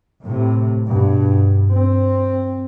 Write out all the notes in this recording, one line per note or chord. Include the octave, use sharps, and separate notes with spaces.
A2 C3
G2 B2
C4